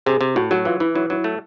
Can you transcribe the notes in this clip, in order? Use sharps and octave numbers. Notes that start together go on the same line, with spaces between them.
C3 G#4
C3
A2 F#4
F#3 F#4
E3 F4
E3 E4
F#3 E4
F#3 E4
A3